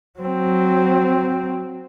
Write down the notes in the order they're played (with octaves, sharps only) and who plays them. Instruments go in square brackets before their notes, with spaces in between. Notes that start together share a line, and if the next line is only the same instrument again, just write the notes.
[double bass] F#3 C4